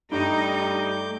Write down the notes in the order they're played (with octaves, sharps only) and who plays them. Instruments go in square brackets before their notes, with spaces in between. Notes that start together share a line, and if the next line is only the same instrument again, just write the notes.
[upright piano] G2 [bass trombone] G3 [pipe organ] A3 D6 G6 [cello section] D#4